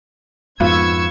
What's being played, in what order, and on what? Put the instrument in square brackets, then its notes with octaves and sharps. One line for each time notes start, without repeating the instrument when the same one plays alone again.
[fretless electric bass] F2 G#2 [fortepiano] B3 F4 [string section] C#6 E6 G#6